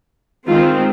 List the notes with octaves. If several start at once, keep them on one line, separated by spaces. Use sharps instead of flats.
D#3 G#3 C4 F4